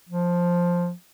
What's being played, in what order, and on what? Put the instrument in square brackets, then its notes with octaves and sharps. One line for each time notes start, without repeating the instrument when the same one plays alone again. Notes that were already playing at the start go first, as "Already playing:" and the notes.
[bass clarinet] F3